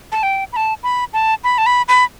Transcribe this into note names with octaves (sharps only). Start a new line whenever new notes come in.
A5
G5
B5
A5
B5
A5
B5
A5
B5
B5